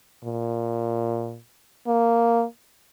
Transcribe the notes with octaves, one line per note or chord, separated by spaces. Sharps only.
A#2
A#3